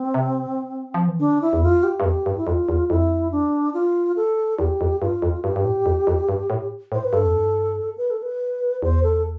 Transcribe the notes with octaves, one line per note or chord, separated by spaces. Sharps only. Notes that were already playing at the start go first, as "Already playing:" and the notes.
Already playing: C4
C3
F3
E3
D3 D4
E4
E2
F2 F4
G4
G2
F2 G4
G2
E4
F2 F4
E2
F2 E4
D4
F4
A4
E2 G4
F2
G2 F4
F2
G2 G4
G2
A2
F2
F2
G2
A2
A2 C5
B4
G2 A4
F2
G2
B4
A4
B4
E2 C5
A4